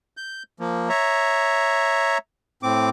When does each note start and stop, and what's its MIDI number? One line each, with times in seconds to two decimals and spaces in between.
0.17 0.43 91
0.60 0.89 53
0.60 0.89 58
0.89 2.18 73
0.89 2.18 76
0.89 2.18 82
2.63 2.90 45
2.63 2.90 60
2.63 2.90 86